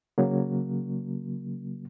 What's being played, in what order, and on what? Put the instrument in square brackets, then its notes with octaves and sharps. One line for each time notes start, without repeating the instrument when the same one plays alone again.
[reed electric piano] C#3 F#3 A#3